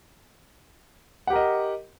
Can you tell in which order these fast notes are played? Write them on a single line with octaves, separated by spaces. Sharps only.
F#5 G4 A#4 D#5